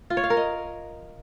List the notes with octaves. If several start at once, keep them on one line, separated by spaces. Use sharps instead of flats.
F4
C#5
F5
A#4
D#5